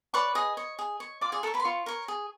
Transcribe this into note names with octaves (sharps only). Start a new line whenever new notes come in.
B4 C#5 D5 C#6
G#4 D#5 D#6
C#5
G#4
C#5
F4 D5 D6
G#4 G#5
A4 A#4 C#5 A5
B4 B5
C6
F4 C#5 C#6
A#4 C#5
G#4